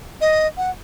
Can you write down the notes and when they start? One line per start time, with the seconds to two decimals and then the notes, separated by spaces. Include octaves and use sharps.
0.21 D#5
0.57 F#5